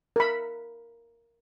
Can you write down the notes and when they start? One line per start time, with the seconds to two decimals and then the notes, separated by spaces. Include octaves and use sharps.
0.16 A#4 B5